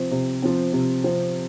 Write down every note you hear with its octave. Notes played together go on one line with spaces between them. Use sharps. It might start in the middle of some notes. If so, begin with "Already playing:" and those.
Already playing: C3 F3 C4
C3
F3 C4
C3
F3 C4